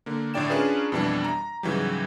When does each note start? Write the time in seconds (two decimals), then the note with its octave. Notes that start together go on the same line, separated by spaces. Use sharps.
0.06 D3 A#3
0.34 A2 D3 E4 D5 G5 E7
0.50 C#4 D4 F4 G#4 A#4 B4
0.92 F2 B2 E3 G3 D4
1.24 A#5
1.63 G#2 C#3 E3 F#3 G3